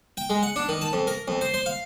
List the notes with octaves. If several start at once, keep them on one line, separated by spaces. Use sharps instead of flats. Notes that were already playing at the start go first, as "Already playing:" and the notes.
G5
G#3
F#5
D4
D#3
A5
F2
A#4
F2
C5
C5
F5